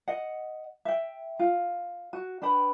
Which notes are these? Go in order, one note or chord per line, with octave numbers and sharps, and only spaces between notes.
D#5 F#5
E5 G5
F4
F#4
D4 B4 G5 B5